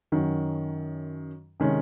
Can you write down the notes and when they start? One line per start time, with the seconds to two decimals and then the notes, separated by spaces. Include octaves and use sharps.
0.12 F#2 D#3 F#3 C#4 F#4
1.60 C3 D#3 G#3 C#4